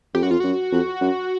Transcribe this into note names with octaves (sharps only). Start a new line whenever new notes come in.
F2 G4
F#2 F#4
F2 F4
F#2 F#4
F2
F#2